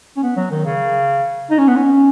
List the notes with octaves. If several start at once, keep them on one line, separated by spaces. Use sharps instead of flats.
C#4
B3
F#3
D#3
C#3
D#4
C#4
B3
C#4